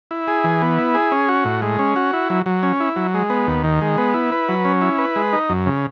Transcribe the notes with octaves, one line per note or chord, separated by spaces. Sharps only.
E4
G#4
E3
B3
E4
G#4
C#4
F#4
A2
G#3
C#4
F#4
E4
F#3
F#3
C#4
E4
F#3
G#3
B3
D#2
D#3
G#3
B3
E4
B4
F#3
C#4
E4
B4
G#3
D#4
F#2
C#3